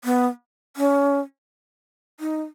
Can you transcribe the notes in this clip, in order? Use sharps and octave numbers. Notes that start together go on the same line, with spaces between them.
B3
C#4
D#4